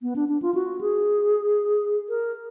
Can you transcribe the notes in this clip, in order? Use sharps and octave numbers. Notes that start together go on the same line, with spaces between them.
B3
D4
D4
F4
F#4
G#4
A#4